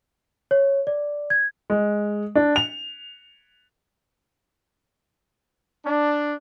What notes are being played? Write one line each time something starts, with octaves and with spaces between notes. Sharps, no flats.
C#5
D5
G#6
G#3
D4
F7
D4